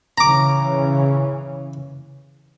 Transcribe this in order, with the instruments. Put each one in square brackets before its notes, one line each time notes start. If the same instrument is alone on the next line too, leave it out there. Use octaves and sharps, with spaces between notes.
[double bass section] C#3 E3 C#4 [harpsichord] A#5 D6